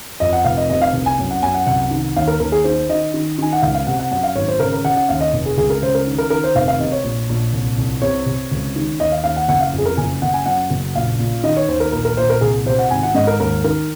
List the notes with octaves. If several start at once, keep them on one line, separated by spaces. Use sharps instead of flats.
F2 D#5
F#5
F1 F5
D#5
C3 D#5
F5
C2
G#5
F#2
F#5
F#2 G#5
F#5
C2 F#5
D#3
D#2 F5
A#4
D#2 A#4
G#4
D#3 C5
D#3 D#5
D#3
D#3 G#5
F#5
C#2 F5
F5
C3 F#5
F#5
F#2 F#5
F5
G#1 C#5
C5
C#3 A#4
A#4
C#3 F#5
F#5
D#2 F5
D#5
F1
G#4
C#2 G#4
A#4
C#3 C5
A#4
D#3
A#4
D#3 A#4
C5
F1 F5
F5
C3 D#5
C#5
A#1
A#1
C2
C2
C3 C#5
C3
C#2
D#3
D#2 D#5
F5
D#2 F5
F#5
F#1 F#5
F5
F2
G#4
A#4
F#1 G#5
F#1 F#5
G#5
F#2 F#5
F#1
A#1 F5
A#2
D#3 D#5
C#5
D#2 C5
A#4
A#1 A#4
A#4
A#1 C5
A#4
C2 G#4
C3 C5
F#5
G#1 G#5
F#5
G#2 D#5
A#4
D#2 A#4
D#3 A#4